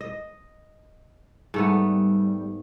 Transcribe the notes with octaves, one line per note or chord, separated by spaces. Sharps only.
D#5
G#2 G3 A3 B3